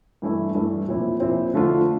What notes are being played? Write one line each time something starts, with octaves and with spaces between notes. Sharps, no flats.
G2 E3 A3 E4
G2 E3 A3 E4
A#2 F3 C4 E4
A#2 F3 C4 E4
D3 F3 A3 D4 F4